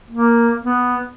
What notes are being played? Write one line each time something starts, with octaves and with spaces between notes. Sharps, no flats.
A#3
B3